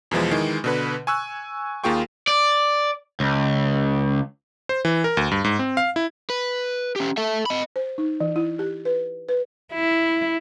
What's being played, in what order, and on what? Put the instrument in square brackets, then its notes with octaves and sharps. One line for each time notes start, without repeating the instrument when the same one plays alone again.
[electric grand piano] E2 B2 E3 F3 G#3
D#3 E3 G#3
B2 D3 B4
G#5 C#6 E6 F#6
D#2 A#3 F4 G#4 G5 C#6
[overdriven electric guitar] D5
C#2
[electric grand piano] C5
E3
A#4
D2
G2
G#2
C4
F5
E4
[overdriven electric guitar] B4
C#4 G4
A4 E5
D#5 B5
[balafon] C5
D#4
E3
E4
G4
B4
B4
[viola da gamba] E4